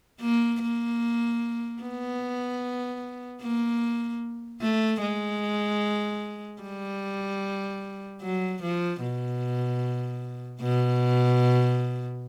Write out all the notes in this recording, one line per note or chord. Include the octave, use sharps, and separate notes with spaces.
A#3
A#3
B3
A#3
A3
G#3
G3
F#3
F3
B2
B2